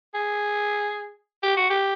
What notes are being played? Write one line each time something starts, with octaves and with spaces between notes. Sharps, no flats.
G#4
G4
F#4
G4